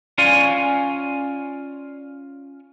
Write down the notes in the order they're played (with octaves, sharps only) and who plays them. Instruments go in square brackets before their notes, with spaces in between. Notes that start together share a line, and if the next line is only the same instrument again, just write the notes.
[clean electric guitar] C#4 F4 D5 F5 G#5